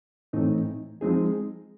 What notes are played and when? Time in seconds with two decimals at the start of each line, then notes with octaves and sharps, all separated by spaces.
0.33 A2 E3 A3 C4 D#4
1.01 F3 G#3 C4 D#4 G#4